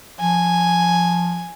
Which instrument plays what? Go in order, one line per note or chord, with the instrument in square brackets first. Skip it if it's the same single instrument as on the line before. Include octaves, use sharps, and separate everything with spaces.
[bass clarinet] F3 [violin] G#5